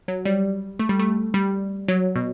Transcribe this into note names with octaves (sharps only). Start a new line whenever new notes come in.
F#3
G3
A3
G3
A3
G3
F#3
B2